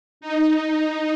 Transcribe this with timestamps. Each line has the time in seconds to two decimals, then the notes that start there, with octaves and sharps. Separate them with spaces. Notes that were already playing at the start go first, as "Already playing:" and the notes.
0.21 D#4